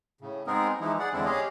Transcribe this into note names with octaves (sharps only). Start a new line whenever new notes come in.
A2 C#3
G#3 B3 C4 D#4 G#4 A#4
E3 F3 G#3 D#4 E4
G#4 D5 F#5
E2 D3 G#3 C4 D4 E4
G4 G#4 C#5 D#5 F5